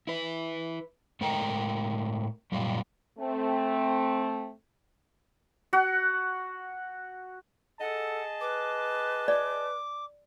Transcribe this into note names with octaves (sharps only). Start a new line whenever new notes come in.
E4 B4
A2 G#3 A4 A#4 G5 A#5
F#2 A#2 G3 F4
A3 C4
F#4 F#5
G#4 A4 D#5 F#5 A5
B4 D6
D5 D6